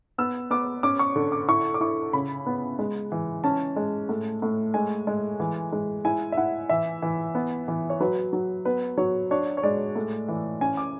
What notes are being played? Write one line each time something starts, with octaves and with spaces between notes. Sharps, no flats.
B3 E6
B3 D6
C#4 D6
C#6
D3
D6
E4 C#6
D6
E4 C#6
C#3 B5
B3
G#3
E3
C#4 A5
G#3
A2
A2
G#3 G#5
G#3
E3
G#3
E4 G#5
E5
E4 F#5
E3 E5
E3
B3
E3
C#5
F#3 B4
F#3
B3 B4
F#3 C#5
D4 C#5
C#5
G#3 D5
A2
E3
C#4 G#5
D6